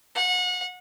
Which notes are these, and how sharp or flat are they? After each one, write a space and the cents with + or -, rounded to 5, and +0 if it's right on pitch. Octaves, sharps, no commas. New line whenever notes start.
F#5 -30